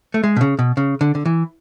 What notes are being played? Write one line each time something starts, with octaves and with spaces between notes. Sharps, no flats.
A3
G#3
B2
C#3
B2
C#3
D3
D3
E3